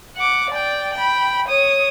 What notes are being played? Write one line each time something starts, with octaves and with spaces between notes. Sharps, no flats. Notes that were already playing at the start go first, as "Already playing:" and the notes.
F#5 D6
D5 G5
G5 B5
C#5 D#6